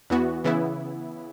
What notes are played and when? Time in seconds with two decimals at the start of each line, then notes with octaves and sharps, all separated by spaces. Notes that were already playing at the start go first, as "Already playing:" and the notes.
0.10 E2 E3 B3 F#4
0.44 C#3 E3 B3 E4